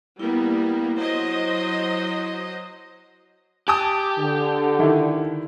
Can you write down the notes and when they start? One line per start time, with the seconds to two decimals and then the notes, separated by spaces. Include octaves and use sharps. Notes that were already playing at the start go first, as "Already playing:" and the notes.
0.19 G3 A#3 B3 E4
0.97 F#3 C5 D#5
3.68 G4 G#5 A5 D#6
4.19 D3
4.79 D#3 E4